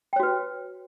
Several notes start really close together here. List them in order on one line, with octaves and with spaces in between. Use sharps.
G5 C#5 F#4 B4